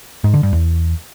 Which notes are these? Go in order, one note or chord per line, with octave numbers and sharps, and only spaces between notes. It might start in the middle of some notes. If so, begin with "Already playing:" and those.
G#2
D3
G2
E2